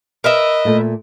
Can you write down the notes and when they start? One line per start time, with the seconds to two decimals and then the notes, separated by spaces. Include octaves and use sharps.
0.24 A#4 B4 D#5 E5
0.65 A#2 A3